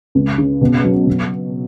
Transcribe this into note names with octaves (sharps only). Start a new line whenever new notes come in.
C#2
C#3
B2
F#3
B2